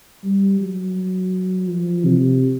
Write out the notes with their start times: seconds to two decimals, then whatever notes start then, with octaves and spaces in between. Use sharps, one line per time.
0.24 G3
0.61 F#3
1.69 F3
2.05 C3